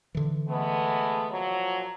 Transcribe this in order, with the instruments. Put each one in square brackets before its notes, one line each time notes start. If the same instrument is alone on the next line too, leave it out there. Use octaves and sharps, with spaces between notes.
[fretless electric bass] D3 E3
[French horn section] G#3 A3 B3
A#2 F3 F#3